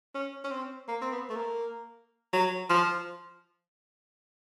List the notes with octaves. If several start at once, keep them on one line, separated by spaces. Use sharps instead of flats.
C#4
C#4
C4
A#3
C4
B3
A3
A#3
F#3
F3